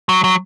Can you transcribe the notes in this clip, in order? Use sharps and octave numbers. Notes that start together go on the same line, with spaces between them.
F#3
F#3